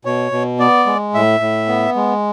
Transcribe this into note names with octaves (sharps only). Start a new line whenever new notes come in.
B2 C#5
B2
B3 D5
G#3
A2 E5
A2
B3
G#3